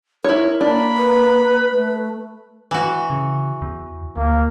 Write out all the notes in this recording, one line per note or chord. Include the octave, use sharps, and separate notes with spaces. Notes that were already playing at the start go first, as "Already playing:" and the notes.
E4 A#4 C#5
A#3 D4 B5
B4
A3
E3 F#4
C#3
E2
D2 A#3